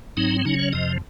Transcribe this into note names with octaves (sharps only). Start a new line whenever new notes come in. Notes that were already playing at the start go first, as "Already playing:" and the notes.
G#2 F#3 C4 D#4
C#3 F#3 C#4 D#4
C#5
F2 C3 F3 D#5